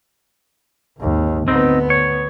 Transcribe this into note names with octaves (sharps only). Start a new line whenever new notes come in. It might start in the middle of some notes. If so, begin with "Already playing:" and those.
G#1 D#2
D2 B3 C4 D#4
C#5